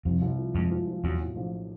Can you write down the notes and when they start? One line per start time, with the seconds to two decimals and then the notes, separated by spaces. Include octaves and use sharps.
0.05 C2 F2
0.22 C2
0.38 F3
0.55 F2 G#3
0.71 F3
0.87 F3
1.04 E2 F#3
1.20 A2
1.36 A#1